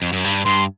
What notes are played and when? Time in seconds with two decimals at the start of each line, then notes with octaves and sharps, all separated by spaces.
0.02 F2
0.13 F#2
0.24 G2
0.45 G2 C6